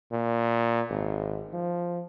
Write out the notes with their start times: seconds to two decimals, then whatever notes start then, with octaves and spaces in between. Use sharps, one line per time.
0.12 A#2
0.90 G#1
1.53 F3